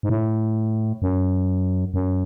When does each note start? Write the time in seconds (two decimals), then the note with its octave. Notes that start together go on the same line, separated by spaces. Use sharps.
0.03 G#2
0.10 A2
1.02 F#2
1.94 F#2